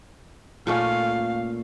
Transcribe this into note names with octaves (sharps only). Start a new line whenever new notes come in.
A#2 A3 C#4 F5